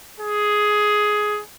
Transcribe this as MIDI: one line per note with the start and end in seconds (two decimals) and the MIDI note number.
0.20 1.40 68